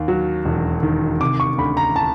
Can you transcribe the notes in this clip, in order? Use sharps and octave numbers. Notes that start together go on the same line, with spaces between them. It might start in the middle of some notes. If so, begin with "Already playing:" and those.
Already playing: D#2
F#3
E1
D#3
C3 D6
C#6
D2 B5
A#5
A5